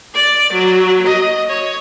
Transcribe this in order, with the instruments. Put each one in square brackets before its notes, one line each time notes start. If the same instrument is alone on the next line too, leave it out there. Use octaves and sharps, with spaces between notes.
[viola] D5
F#3
D#5
C#5